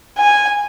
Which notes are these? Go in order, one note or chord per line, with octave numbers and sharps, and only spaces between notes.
G#5